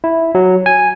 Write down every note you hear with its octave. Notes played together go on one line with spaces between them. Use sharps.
E4
F#3
G#5